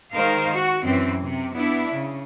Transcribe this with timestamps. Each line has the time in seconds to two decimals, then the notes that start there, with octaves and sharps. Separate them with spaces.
0.13 D#3 G#3 A#4 C5 F5
0.55 F#4
0.85 F#2 E3 C4
1.22 C3
1.54 B3 D4 E4
1.91 C#3